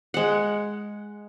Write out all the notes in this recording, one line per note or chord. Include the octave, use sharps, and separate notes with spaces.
G#3 F#5